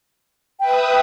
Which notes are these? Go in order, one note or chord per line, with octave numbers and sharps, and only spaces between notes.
B4 E5 G5 D#6